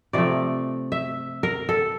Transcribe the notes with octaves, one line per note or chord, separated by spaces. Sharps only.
C3 F3 A3 D5
E5
A#4
A4